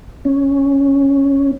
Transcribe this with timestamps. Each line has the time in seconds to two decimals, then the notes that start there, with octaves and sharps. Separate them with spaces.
0.25 C#4